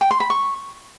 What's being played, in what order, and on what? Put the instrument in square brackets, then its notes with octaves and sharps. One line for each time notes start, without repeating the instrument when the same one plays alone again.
[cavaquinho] G5
C6
B5
C#6